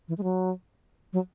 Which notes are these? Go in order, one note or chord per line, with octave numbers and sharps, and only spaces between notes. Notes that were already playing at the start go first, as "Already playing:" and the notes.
E3
G#3
F#3
F#3